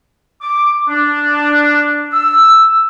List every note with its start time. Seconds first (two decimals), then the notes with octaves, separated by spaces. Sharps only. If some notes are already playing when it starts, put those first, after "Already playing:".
0.42 D6
0.89 D4
2.13 E6